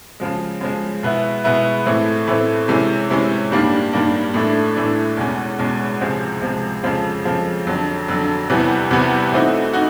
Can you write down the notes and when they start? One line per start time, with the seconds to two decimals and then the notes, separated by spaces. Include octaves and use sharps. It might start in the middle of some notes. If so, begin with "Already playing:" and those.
0.20 C#3 F3 G#3
0.61 C#3 F3 G#3
1.03 B2 G#3 B3 E4
1.44 B2 G#3 B3 E4
1.86 A2 E3 A3 C4
2.27 A2 E3 A3 C4
2.68 C3 E3 G#3 C#4
3.10 C3 E3 G#3 C#4
3.52 G2 D#3 G3 A#3 D4
3.93 G2 D#3 G3 A#3 D4
4.34 A2 E3 A3 D4
4.75 A2 E3 A3 D4
5.17 E2 B2 G#3 C#4
5.59 E2 B2 G#3 C#4
6.01 C#2 C3 F3 G#3
6.42 C#2 C3 F3 G#3
6.83 F2 C#3 F3 G#3
7.25 F2 C#3 F3 G#3
7.67 F2 D3 F#3
8.08 F2 D3 F#3
8.50 E2 C3 E3 G3 B3
8.91 E2 C3 E3 G3 B3
9.32 E3 A3 C4 D#4 F#4
9.73 D#4 F#4